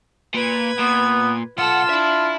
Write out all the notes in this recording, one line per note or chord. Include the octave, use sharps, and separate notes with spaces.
A#2 B4 G#6
A#2 B3
B1 F4 A4 F#5 E6
D4 E5 B5